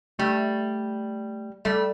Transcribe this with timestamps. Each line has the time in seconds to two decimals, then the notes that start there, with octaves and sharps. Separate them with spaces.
0.19 G3 A3
1.65 G3 A3